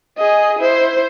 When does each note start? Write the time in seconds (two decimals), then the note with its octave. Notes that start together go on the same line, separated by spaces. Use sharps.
0.18 G#4 D#5
0.59 E4 C5